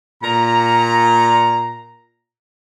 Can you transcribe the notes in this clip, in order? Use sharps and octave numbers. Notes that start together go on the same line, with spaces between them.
A#2 A#5